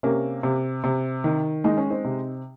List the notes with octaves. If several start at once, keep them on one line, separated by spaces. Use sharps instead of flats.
C3 A#3 C#4
C3
C3
D#3
G#3 D#4
C#4
C4 D#4
C3